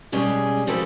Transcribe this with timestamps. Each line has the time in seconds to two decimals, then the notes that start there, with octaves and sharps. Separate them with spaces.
0.12 B2 G3 G#3 C#4 G#4 G#5
0.67 F3 G#3 F#4 G4 A4 B4